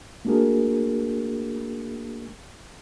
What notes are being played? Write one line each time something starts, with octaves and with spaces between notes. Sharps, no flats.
A3 A#3 D4 F#4 G#4 A#4